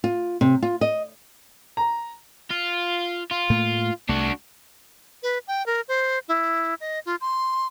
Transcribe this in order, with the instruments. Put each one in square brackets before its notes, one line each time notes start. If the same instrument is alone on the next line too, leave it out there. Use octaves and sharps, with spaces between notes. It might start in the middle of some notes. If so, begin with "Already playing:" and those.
[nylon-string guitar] F4
C3
F4
D#5
[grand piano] A#5
[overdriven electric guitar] F4
F4
[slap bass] A2 A3 A#3
[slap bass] C2 A3 [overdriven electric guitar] D4 F#4
[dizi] B4
G5
A#4
C5
E4
D#5
F4
C6